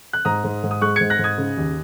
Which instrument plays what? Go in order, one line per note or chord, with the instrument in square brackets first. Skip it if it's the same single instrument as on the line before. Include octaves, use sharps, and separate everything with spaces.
[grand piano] F#6
G#2 A#5 D#6
G#2
G#2
D#6
G#3 C#6 F#6
G#2 G#6 C#7
F#6 A#6
G#2
D#6 G#6
C#3
D#2